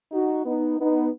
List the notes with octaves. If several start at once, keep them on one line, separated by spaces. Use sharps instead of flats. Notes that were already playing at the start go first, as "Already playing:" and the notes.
D#4 F#4
B3 D#4
B3 D#4